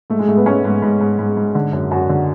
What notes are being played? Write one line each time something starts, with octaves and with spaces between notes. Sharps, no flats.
G#2 A3
G#3
G#2 A3
B3
G#2 C#4
G#2
G#2
G#2
G#2
G#2
D3
F#2
F#2 F#4
D3